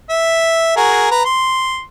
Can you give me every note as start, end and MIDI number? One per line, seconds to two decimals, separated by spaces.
0.10 0.76 76
0.77 1.09 66
0.77 1.09 68
0.77 1.09 70
1.11 1.22 71
1.11 1.22 82
1.25 1.81 84